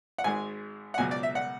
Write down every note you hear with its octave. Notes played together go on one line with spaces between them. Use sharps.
F#5
G#1 G#2 G#3 G#5
F#5
C#2 B2 F#3 G#5
D5
E5
F#5